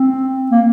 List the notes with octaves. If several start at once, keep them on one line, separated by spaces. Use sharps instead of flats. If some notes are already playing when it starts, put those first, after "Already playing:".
Already playing: C4
A#3